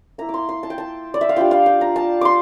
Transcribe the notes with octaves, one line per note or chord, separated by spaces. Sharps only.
A#3 E4 A#5
D6
C6
C6
A5
G5
A5
D5
E5
F5
G3 D4 F4 G5
F5
G5
A#5
A5
C6 D6